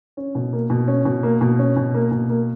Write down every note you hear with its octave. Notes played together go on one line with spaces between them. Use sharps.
C#4
B2
A#3
B2
C#4
B2
A#3
B2
C#4
B2
A#3
B2
A#3